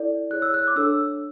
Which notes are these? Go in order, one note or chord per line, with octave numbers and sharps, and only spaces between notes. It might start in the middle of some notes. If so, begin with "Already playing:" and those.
Already playing: E4 A4 D5
E4 G#4 C#5 F#6
E6
F#6
D6
D4 A4 C#5 E6